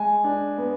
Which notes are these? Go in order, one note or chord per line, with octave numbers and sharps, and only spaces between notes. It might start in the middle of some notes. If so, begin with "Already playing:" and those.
Already playing: G#3 G#5
D4
B3